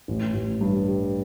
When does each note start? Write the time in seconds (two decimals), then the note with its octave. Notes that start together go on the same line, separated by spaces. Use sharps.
0.08 A1
0.34 A1
0.61 G2
0.88 G3